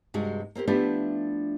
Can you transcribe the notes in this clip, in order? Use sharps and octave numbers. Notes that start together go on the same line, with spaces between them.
G2 C3 G#3 F#4
A#3 C4 G4 A#4
F3 A3 B3 D4 E4 G4